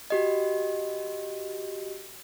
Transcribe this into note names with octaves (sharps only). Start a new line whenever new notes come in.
F#4 G4 D#5